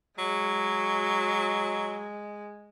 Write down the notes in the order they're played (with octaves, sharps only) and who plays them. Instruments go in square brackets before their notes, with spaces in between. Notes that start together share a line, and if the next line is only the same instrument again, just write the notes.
[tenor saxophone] F#3 [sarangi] G#3